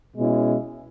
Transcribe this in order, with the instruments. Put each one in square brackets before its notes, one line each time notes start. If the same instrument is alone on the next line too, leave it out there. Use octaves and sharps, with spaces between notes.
[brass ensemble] B2 G#3 C#4 E4